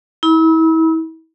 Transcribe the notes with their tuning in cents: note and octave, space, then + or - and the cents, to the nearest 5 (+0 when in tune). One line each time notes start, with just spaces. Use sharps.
E4 -35 B5 -30